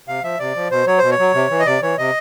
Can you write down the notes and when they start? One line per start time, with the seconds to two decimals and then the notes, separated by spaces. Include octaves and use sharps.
0.07 C3 F5
0.23 F3 E5
0.39 C3 D5
0.56 F3
0.71 B2 C5
0.87 F#3 C#5
0.98 B2 C5
1.11 C#5
1.19 F#3
1.34 C3
1.50 E3
1.59 D#5
1.66 C3 D5
1.82 E3 C#5
1.98 C3 D#5